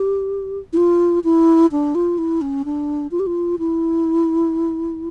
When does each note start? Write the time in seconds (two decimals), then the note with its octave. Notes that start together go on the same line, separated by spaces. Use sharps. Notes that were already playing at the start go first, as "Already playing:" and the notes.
Already playing: G4
0.73 E4
0.77 F4
1.24 E4
1.72 D4
1.95 F4
2.18 E4
2.41 C#4
2.65 D4
3.11 F4
3.20 G4
3.27 F4
3.59 E4